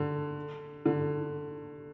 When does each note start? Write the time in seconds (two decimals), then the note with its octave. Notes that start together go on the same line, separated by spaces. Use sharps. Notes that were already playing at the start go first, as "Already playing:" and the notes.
Already playing: D3
0.86 D3